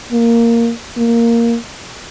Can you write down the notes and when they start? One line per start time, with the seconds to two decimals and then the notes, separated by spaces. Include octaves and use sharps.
0.12 A#3
0.97 A#3